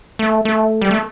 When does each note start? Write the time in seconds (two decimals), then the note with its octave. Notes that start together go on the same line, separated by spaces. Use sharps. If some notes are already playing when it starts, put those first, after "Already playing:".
0.19 A3
0.45 A3
0.82 G3
0.91 A3